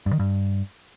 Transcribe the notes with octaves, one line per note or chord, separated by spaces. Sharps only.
G2
D#3
G2